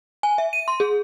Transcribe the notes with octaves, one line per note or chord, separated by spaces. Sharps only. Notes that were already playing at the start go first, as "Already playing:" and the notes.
G#5
E5
D#7
C6
G#4